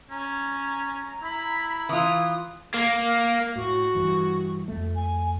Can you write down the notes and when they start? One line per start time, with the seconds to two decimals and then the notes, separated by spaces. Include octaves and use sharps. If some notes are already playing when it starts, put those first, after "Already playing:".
0.11 C#4 A#5
1.23 E4 B5
1.89 E3 F4 D#6
2.74 A#3
3.56 A2 F#4
3.95 G2 E3
4.68 F2 A3
4.96 G#5